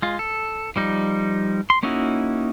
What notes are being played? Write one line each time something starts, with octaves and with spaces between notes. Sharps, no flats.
G#3 F4
A4
F3 G3 D#4
C6
A#3 C#4 D#4 E4 F#4